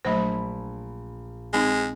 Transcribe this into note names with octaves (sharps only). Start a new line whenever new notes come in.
A#1 F#3 A3 C5 B5
G#3 C4 D#4